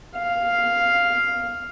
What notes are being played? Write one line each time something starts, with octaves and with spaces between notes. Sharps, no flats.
F5